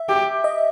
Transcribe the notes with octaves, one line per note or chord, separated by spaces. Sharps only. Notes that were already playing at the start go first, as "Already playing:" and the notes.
Already playing: E5
G4
D#5